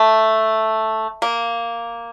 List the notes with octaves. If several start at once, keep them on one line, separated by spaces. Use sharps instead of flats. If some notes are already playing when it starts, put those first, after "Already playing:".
Already playing: A3
A#3